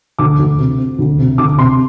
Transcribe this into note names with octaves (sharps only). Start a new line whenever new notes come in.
D2 D6
D2
C3
C4
D2
C3
D2 D6
C3 C6